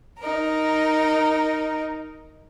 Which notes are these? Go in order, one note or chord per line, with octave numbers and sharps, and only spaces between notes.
D#4 A#4